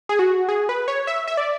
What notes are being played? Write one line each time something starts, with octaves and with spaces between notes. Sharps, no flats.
G#4
F#4
G#4
B4
C#5
E5
E5
D5